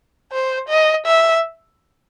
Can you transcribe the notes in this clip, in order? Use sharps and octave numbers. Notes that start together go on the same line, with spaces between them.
C5
D#5
E5